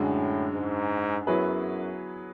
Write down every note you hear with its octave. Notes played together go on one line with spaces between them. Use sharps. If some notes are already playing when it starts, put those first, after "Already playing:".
Already playing: F#2 A2 D3 G#3 D4 F#4
G#2
F#2 F#3 B3 E4 G#4 B4